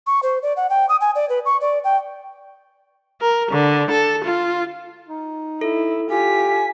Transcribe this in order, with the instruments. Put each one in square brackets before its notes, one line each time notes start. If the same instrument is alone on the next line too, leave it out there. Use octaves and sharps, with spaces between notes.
[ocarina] C#6
C5
D5
F#5
G5
D#6
G#5
D5
B4
C#6
D5
G5
[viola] A#4
D3
A4
F4
[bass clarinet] D#4
[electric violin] E4 [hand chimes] A4
[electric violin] F4 B6 [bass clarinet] G4 [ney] G#5